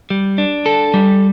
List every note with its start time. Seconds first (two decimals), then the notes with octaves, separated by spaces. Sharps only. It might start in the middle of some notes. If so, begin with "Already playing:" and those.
0.10 G3
0.38 D4
0.66 A4
0.94 G3